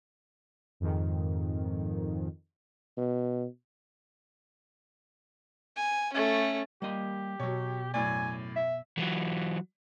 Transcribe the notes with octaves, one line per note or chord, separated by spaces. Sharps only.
F2 G#2 D#3
B2
G#5
A3 C#4
G3 A#3 G4 D#5
B2 F#3 C#5
F#2 A2 D5 G#5
E5
E3 F#3